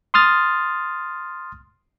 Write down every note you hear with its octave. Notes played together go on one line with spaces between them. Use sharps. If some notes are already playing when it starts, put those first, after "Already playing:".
C6 D#6 F6 A6